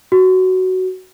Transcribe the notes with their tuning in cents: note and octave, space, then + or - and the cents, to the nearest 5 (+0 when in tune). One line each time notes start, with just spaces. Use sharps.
F#4 +10